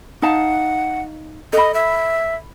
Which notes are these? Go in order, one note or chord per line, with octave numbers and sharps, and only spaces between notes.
D#4 F5 F#5 A5
A4 D#5 B5
E5